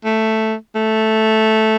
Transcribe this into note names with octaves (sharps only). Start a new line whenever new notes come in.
A3
A3